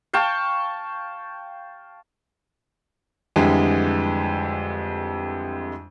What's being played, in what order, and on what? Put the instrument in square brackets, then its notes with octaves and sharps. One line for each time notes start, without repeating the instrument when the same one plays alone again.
[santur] F5 G5 A5 C#6
[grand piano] F2 D3 E3 G3 G#3